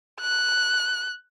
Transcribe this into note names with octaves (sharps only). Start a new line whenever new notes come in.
F#6